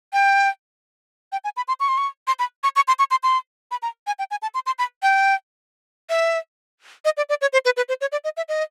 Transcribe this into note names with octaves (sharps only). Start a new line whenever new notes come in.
G5
G5
G#5
B5
C6
C#6
C6
C#6
C6
B5
C#6
C#6
C6
C#6
C6
C6
B5
A#5
G#5
G5
G#5
A5
C6
C6
B5
G5
E5
D#5
D5
D5
C#5
C5
B4
B4
C5
C#5
D5
D#5
E5
D#5